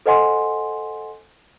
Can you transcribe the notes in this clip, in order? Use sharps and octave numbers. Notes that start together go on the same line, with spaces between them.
A4 C5 D#5 F#5 G#5 C6